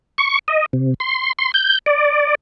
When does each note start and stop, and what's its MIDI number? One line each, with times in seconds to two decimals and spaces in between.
0.18 0.39 85
0.48 0.66 75
0.73 0.94 48
1.00 1.33 84
1.39 1.52 84
1.54 1.79 91
1.86 2.35 74